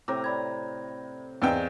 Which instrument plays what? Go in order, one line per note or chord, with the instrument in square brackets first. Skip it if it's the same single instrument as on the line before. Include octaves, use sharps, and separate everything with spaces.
[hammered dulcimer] A2 C3 A#5 [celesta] D6
[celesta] D5 B5 G#6
[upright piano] E2 C4 G5 [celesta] D5 D#5 F5